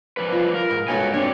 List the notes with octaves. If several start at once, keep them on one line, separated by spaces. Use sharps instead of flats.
F3 G3 B4
F4
A#4
G#2
G2 G#3 F#4 A4 C#5 G#5
C4 D4 C#5